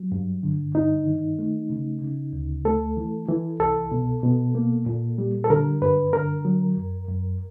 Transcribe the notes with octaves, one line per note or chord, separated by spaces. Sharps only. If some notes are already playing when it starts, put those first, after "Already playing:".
Already playing: F#3
G2
D3
G2 D#4
D#3
A3
C#3
C#3
D2
A3 A4
E3
E3
C2 A4
B2
B2
A#3
A#2
G3
A4
D3 A#4
G2 B4
D3 A#4
F#3
F#2
F#2